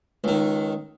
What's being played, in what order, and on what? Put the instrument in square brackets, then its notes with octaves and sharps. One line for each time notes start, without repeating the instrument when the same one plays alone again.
[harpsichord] C#2 D#3